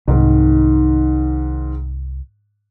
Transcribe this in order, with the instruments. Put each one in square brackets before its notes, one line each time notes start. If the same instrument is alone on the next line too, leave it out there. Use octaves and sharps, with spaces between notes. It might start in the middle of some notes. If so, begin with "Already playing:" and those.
[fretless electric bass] C2 [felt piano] G#2 D#3